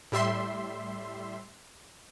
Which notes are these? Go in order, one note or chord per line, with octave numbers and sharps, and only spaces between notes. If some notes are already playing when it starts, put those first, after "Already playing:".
A2 G3 E5 C6